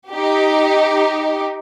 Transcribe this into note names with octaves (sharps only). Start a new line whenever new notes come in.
D#4 G4